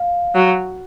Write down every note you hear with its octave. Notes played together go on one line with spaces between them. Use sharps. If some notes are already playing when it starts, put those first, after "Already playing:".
Already playing: F5
F#3